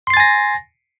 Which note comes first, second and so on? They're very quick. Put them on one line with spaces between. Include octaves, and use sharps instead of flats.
C6 C7 A6 G#5 A#6